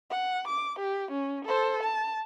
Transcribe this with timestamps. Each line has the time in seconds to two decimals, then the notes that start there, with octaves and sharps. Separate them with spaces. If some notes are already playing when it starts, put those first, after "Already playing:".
0.10 F#5
0.48 D6
0.80 G4
1.12 C#4
1.46 A4 C5
1.83 A5